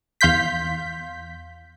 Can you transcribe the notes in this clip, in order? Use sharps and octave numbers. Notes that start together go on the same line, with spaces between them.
E2 F5 C6 G6 B6